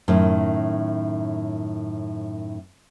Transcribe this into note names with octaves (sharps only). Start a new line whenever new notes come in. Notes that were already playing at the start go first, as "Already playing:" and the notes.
F#2 A2 D#3